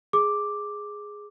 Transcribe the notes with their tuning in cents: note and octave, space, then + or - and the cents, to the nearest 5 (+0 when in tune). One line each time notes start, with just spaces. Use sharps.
G#4 +0 D6 +0